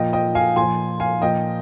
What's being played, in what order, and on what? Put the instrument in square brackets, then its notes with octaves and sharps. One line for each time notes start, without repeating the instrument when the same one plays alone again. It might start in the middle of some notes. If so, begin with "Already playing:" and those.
Already playing: [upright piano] A#2 F3 D#5 G5
D#5 G5
F5 G#5
A#2 F3 G#5 C6
F5 G#5
A#2 F3 D#5 G5